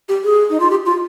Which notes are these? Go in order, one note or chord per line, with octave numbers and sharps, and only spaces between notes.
G4
G#4
D#4
F4
G4
F4